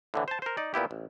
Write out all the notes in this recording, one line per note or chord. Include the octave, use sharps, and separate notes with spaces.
A2 D3 E3
C5 A5
A#4 C5
D#4 D5
A#2 B3 E4 G4
A1